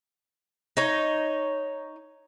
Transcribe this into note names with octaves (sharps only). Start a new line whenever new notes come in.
D#4 C#5